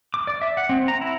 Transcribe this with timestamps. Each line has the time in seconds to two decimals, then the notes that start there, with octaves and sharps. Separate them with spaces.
0.14 D6
0.27 D5
0.42 E5
0.57 F#5
0.69 C4
0.88 A#5
1.01 E4